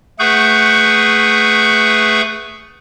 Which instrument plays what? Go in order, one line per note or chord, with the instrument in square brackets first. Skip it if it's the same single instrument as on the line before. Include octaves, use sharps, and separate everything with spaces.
[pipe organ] A3 G#4 B4 F#5 C#6 G6